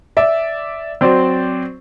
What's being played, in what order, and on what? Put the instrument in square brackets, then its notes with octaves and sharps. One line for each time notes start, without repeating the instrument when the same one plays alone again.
[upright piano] D5 E5
F#3 C4 C5 D5